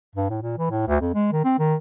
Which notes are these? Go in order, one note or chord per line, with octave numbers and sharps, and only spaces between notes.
G2
A2
A#2
E3
A2
D2
F2
G#3
D#3
C4
D#3